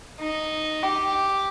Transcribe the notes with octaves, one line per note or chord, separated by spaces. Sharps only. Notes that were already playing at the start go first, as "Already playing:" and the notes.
D#4
G4